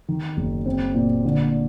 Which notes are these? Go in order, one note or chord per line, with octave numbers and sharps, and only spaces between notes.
D#3
F#1
C4
A#2
D3